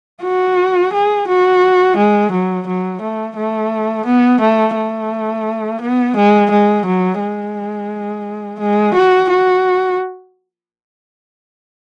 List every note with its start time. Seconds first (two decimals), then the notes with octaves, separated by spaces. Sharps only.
0.22 F#4
0.93 G#4
1.27 F#4
1.97 G#3
2.31 F#3
2.67 F#3
3.01 A3
3.36 A3
4.06 B3
4.41 A3
4.75 A3
5.81 B3
6.16 G#3
6.50 G#3
6.85 F#3
7.19 G#3
8.60 G#3
8.94 F#4
9.30 F#4